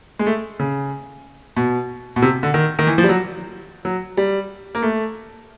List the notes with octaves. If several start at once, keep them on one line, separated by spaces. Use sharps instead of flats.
G#3
A3
C#3
B2
B2
C3
D3
D#3
D#3
E3
F3
G3
F#3
F#3
G3
A#3
A3